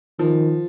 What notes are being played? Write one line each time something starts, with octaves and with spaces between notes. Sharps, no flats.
D#3 F3